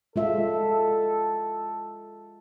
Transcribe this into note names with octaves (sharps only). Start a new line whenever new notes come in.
G#3 F4 A4 E5